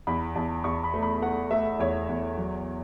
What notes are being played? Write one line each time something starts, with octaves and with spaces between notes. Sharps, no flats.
E2 B5
E2 A5
E2 C#6
B5
A3
B5
A3 F#5
A3 E5
E2 C#5
E2
F#3